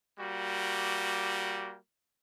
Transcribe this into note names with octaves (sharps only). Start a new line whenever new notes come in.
G3 A#3 F#4